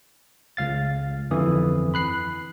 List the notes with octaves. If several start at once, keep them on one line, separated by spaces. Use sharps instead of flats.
C#2 F5 A6
G1 F2 E3 D#6
B5 F#6 C7